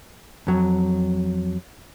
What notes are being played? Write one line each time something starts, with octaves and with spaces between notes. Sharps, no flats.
F2 F#3